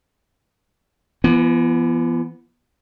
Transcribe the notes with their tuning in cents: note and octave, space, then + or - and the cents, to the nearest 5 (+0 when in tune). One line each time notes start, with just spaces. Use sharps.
E3 +45 B3 -10